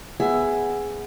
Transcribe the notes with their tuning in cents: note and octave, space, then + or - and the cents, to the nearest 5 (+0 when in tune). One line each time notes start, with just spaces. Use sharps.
B3 +5 G#4 +0 E5 +15